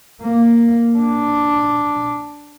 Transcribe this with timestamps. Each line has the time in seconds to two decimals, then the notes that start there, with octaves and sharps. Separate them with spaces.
0.23 A#3
0.98 D4